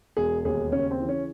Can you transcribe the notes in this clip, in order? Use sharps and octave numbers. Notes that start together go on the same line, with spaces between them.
E1 G#4
D#2 G#4
C#3 C#4
C4
E3
C#4